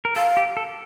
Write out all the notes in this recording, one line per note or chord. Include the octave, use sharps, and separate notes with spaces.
A#4
A4 F5
G4
A4